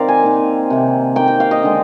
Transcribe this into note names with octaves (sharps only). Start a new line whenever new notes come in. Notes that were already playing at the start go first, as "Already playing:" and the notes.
Already playing: D#3 C4 A#4 D5 F5
G#5
D#3 A#3
C3 D#3 A#3
D#3 A#3 G5
G5
F5
D#5
D3 G#3